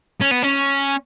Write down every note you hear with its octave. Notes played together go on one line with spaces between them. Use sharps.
C#4
B3
C#4